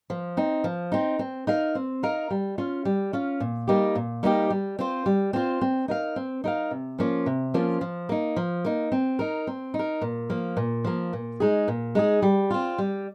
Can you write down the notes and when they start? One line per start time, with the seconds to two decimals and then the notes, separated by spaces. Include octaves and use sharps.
0.10 F3
0.37 C4 D#4
0.64 F3
0.92 C4 D#4
1.19 C4
1.47 D#4 A#4 F5
1.75 C4
2.03 D#4 A#4 F5
2.30 G3
2.58 C#4 F4
2.85 G3
3.13 C#4 F4
3.40 A#2
3.67 G3 A#3 D#4 G4
3.95 A#2
4.23 G3 A#3 D#4 G4
4.50 G3
4.79 C4 F4 C5
5.06 G3
5.33 C4 F4 C5
5.61 C4
5.88 D#4 A#4 F5
6.16 C4
6.44 D#4 A#4 F5
6.71 C3
6.98 F3 A#3 C#4 F4
7.26 C3
7.54 F3 A#3 C#4 F4
7.81 F3
8.09 A#3 D#4
8.36 F3
8.65 A#3 D#4
8.92 C4
9.19 D#4 A#4
9.47 C4
9.74 D#4
9.79 A#4
10.01 A#2
10.30 F3 A#3
10.57 A#2
10.84 F3 A#3
11.13 A#2
11.40 G#3 D#4 G#4
11.68 A#2
11.95 G#3 D#4 G#4
12.22 G3
12.51 C4 F4
12.78 G3